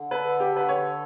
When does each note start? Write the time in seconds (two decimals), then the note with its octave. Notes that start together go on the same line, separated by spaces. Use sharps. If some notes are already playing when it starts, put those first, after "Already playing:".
Already playing: D3
0.11 A4 B4
0.40 G4
0.54 D3 B4
0.69 C#5